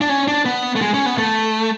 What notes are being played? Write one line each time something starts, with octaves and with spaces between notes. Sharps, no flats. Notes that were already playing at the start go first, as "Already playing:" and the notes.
D4
C#4
D4
B3
A3
G#3
C#4
B3
A3